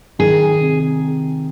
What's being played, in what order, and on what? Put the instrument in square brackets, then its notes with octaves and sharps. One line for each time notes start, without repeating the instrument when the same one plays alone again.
[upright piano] D#3 [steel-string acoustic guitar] G#4
[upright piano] C3